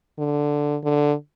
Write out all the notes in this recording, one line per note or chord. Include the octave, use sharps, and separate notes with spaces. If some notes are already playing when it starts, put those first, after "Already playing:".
D3
D3